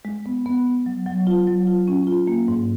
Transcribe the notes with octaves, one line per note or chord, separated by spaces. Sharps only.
G#3
B3
B3
B3
F#3
F#3
F4
F#3
F4
C#4
F4
A#3
G#2